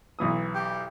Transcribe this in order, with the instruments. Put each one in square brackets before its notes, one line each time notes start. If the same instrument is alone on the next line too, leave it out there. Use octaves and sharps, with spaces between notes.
[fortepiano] B1 E3 D#6
[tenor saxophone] G4